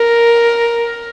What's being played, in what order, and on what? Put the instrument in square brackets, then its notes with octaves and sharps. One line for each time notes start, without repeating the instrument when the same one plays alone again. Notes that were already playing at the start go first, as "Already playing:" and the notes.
Already playing: [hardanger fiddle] A#4